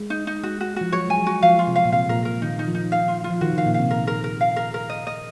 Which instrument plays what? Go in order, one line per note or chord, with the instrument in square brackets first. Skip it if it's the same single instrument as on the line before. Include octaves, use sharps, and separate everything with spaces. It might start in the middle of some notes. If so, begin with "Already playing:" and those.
Already playing: [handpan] G#3
[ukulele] D#4
D#4
[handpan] G#3 [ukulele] F#4
[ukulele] F#4
[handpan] F3 [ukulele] F#4
[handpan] F#3 [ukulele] C#5
[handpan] G#3 [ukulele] G#5
[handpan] F#3
[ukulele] F#4
[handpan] F3 [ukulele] F5
[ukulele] F4
[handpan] C3
[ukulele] F5
[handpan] A#2
[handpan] C3 [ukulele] F5
[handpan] A#2 [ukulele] A#4
[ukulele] A#4
[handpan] D#3 [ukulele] D#4
[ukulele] D#4
[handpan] F3
[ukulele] D#4
F5
F4
F4
[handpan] F3
[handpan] D#3 [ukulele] F#4
[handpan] C#3 [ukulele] F5
[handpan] A#2
[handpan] C3 [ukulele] F5
[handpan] C3 [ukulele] A#4
[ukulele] A#4
A#4
F5
A#4
A#4
D#5
D#5